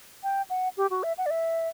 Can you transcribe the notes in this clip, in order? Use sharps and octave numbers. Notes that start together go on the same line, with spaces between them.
G5
F#5
G4
F#4
E5
F#5
D5
E5